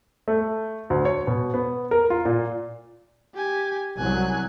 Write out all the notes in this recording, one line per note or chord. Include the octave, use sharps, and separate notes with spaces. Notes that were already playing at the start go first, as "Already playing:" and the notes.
A3
D2
C#5
B2
B3
A#4
F4
A#2
G4 G#5
C2 F#3 G#5 F#6